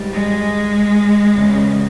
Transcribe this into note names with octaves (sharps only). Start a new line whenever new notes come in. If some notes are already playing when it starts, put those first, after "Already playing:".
Already playing: G#2 G3
G#3
E2 C#3 G3